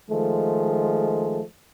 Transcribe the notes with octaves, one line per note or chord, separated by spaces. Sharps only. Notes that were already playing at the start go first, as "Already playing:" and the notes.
D#3 F3 G#3 A3